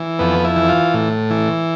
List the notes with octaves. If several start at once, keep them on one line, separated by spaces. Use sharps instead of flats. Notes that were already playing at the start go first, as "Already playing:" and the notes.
Already playing: E3
F2 B3
E4
E3
F4
A2
E3